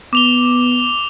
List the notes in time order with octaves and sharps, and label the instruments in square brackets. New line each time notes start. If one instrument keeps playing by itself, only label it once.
[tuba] B3 [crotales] D6 F7 G7